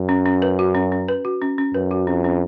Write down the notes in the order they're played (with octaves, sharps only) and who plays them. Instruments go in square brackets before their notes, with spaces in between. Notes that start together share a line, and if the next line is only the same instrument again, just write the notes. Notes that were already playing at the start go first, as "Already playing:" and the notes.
Already playing: [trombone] F#2
[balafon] C#4
C#4
B4
F#4
C#4
C#4
B4
F#4
C#4
C#4
[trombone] F#2 [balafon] B4
[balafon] F#4
[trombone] F2 [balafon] C#4
[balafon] C#4